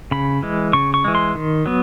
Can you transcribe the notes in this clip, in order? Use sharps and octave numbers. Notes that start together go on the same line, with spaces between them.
C#3 B5
E3 G#3
C#3 C#6
C#6
E3 G#3
C6
D#3
F#3 B3